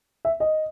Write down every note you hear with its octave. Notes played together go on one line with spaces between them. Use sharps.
E5
D#5